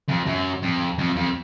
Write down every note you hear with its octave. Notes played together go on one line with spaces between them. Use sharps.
F2
F#2
F2
F2
F2